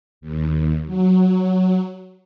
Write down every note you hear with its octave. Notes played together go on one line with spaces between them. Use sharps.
D#2
F#3